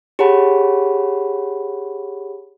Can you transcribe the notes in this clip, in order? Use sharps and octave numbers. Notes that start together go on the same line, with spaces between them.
G4 G#4 C#5 F#5 A5 B5